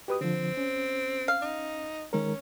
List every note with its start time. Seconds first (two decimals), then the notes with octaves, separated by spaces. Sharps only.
0.08 B2 G4 B4 D#6
0.21 D3 F3 C4
0.57 C#4
1.28 F5
1.42 D#4
2.13 D#3 G#3 C#4 A#4